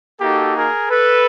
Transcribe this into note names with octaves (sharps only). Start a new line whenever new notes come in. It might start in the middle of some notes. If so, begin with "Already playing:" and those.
A#3 D#4 F#4 G4 A4
G#4 A#4
A4 B4